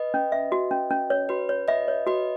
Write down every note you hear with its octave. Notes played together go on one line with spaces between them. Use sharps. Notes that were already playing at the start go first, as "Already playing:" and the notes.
Already playing: B4 D#5
C#4
E5
F#4
C#4
C#4
C#5
F#4 B4
C#5
B4 D#5 E5
C#5
F#4 B4 D#5